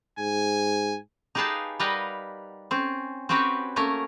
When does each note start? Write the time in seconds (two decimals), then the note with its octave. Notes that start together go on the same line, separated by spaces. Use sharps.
0.19 G#2 G#5
1.35 D#4 G4 G#4 B4 F5 A5
1.80 G3 A#4 B4 D#5 F5 F#5
2.71 C4 C#4
3.29 C4 C#4 F#4 G4 B4 C#5
3.76 A3 A#3 C#4 A#4